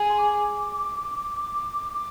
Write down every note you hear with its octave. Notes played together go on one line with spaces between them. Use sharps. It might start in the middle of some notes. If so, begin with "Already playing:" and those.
Already playing: G#4
C6
D6
D6